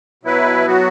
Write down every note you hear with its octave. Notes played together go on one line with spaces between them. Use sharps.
B2 F#3 E4 B4
F#3 B3 F#4